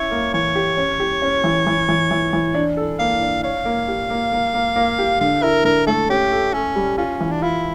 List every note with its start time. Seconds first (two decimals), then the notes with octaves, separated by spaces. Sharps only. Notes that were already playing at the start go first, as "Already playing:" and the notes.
Already playing: C#4 E4 C#5
0.11 A#3
0.34 E3 C#5
0.55 G4
0.77 C#4
1.00 G4
1.22 C#4
1.44 E3
1.67 E3
1.89 E3
2.11 E3
2.33 E3
2.54 D4
2.77 A4
2.99 A#3 F5
3.21 D4
3.43 C#5 F5
3.65 A#3
3.88 G4
4.10 A#3
4.33 A#3
4.54 A#3
4.76 A#3
4.99 G4
5.21 D3 F5
5.43 E4 A#4
5.65 D3 A#4
5.87 A3 A4
6.09 C#4 G4
6.32 A4
6.53 C#4 A4
6.76 G3
6.97 C#4 F4
7.20 E3
7.31 D4
7.42 E4 F4